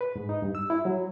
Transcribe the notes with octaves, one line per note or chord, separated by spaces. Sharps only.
B4
G#2
D#4
G2
E6
E4
F#3